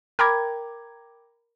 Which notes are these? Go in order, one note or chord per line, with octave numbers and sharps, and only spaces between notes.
A#4 G5 A#5 B5 D6 G#6